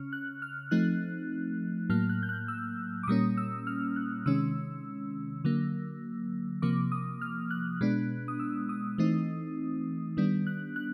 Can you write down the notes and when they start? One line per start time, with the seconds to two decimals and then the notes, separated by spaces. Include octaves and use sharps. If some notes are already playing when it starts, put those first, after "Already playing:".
Already playing: C#3 C#4 F6
0.13 F#6
0.42 F6
0.71 F3 A3 C4 D#4 F#6
1.90 A2 F#3 A#3 F6
2.09 F#6
2.23 G6
2.29 F#6
2.48 E6
3.03 D6
3.07 A#2 G3 A#3 C#4 D#6
3.37 E6
3.67 F6
3.96 F#6
4.26 C3 D#3 G#3 C#4 E6
5.45 D3 F#3 A#3
6.62 C3 F3 A#3 D6
6.92 D#6
7.22 F6
7.51 F#6
7.81 B2 G#3 B3 D4
8.28 D#6
8.40 E6
8.69 D#6
8.98 E3 A3 C4 D#4
10.17 D#3 G3 B3 D4
10.47 F#6
10.76 F#6